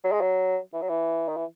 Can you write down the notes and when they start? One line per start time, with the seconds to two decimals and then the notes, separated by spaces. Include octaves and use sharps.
0.04 F#3
0.12 G#3
0.21 F#3
0.73 E3
0.82 F#3
0.89 E3
1.28 D#3
1.36 E3